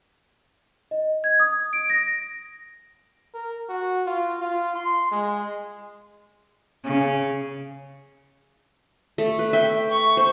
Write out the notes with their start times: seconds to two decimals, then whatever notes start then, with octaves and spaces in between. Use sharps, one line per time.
0.91 D#5
1.24 G#6
1.40 D#6
1.73 D7
1.90 A#6
3.34 A#4
3.69 F#4
4.06 F4
4.41 F4
4.76 C6
5.11 G#3
6.84 C#3
9.18 A3
9.39 B4
9.53 E5 G5
9.90 C#6
10.17 C5